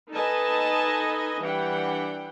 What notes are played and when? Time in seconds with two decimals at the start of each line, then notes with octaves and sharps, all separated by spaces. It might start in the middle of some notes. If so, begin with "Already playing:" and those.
0.11 D#4 A4 B4 D#5 G#5 A5
1.41 E3 G3 D4 F#5 G5